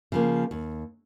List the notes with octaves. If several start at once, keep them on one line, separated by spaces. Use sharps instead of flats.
C#3 F3 A#3
D#2